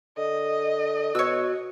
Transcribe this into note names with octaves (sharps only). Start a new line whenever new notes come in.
D3 D#5
B2 F#4 C#5 E6